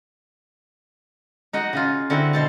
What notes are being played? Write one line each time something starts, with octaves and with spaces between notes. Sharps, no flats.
D#4 F#4 D#5 F#5
C#3 D#4 F4
D3 C4 E4 F#4
B2 C5 A5